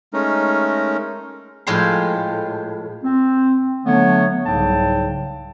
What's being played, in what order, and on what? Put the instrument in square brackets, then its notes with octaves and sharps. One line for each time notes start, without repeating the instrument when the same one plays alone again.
[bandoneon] G#3 A3 C#4 D#4 A#4
[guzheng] A2 F3 G#3 G4 C6
[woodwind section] C4
D3 F#3 A3 B3 D4 C#5
C2 G#2 C#3 F#3 G5 A5